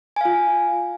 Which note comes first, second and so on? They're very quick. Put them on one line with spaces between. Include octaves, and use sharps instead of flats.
G#5 F5 F4